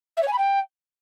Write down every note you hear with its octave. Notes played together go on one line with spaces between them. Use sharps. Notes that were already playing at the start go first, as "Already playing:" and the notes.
E5
C#5
G#5
B5
G5